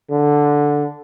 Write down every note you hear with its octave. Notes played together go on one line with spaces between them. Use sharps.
D3